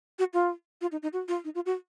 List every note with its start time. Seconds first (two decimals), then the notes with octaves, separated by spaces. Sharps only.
0.19 F#4
0.34 F4
0.81 F4
0.92 D#4
1.02 D#4
1.13 F#4
1.28 F4
1.44 D#4
1.55 F4
1.66 F#4